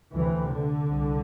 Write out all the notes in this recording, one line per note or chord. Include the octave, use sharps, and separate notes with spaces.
D2 C3 E3
D3
C2